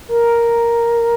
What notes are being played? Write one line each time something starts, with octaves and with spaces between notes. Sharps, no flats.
A#4